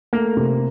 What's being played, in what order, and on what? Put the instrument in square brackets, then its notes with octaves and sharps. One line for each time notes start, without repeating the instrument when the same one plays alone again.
[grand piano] A3 [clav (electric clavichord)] A#3
[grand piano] C3